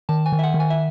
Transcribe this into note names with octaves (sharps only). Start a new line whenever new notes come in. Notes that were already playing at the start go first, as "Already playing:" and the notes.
D#3 A5
G#5
D#3
E5
F#5
D#3
G#5
E5